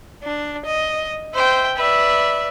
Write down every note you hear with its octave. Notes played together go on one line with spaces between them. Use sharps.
D4
D#5
C5 E5 G5
B4 D5 E5